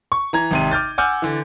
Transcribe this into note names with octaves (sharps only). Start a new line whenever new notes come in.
C#6
E3 A#5 G#6
G#1 C3 D#7
D6 F6 G6 A6
F#5 G#5 D6 E6 F6 G6
D3 E3